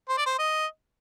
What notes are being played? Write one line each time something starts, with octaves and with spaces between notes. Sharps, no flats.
C5
D5
C5
D#5